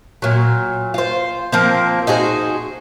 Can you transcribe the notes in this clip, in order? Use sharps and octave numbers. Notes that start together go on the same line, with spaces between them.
A#2 F#3
F4 C5
F3 A#3 C4
D#4 F#4 G#4 C5